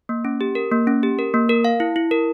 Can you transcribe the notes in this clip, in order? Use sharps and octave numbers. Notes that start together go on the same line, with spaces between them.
A#3
C#4
G4
A#4
A#3
C#4
G4
A#4
A#3
A#4
F5
E4
E4
A#4